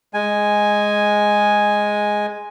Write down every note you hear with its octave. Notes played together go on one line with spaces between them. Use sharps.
G#3 G#5